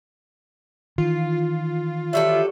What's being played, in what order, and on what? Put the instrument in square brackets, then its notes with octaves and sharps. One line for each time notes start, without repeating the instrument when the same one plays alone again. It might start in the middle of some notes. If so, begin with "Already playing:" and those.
[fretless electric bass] D#3 E3 [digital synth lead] F4
[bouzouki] F#3 G3 A4 [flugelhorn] E5